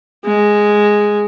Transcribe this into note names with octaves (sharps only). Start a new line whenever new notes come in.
G#3